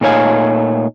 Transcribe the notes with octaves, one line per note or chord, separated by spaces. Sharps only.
A#2 A3 D#4 C#5 F5 G#5